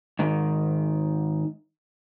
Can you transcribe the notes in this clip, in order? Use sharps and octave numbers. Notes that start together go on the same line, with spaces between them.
G#2 D#3